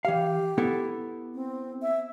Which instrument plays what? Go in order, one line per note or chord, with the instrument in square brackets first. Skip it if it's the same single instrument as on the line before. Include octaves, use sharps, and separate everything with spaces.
[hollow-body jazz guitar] E3 F5 [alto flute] G4
[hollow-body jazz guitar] B3 E4 A4
[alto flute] C4
E5